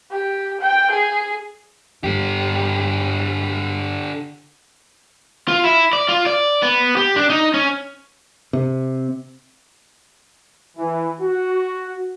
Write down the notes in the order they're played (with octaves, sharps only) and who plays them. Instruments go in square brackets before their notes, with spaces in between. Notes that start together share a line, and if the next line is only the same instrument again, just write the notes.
[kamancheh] G4
G5
G#4
[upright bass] G2 [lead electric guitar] D3 G4
[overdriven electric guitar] F4
E4
D5
F4
D5
B3
G4
D4
D#4
C#4
[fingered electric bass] C3
[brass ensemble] E3
F#4